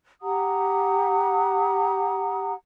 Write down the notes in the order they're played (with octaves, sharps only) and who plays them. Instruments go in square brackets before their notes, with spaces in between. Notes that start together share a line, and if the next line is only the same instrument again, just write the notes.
[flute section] G4 F#5 A#5 D#6